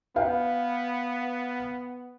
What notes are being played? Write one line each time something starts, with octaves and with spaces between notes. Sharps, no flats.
B3 B4 F5 G5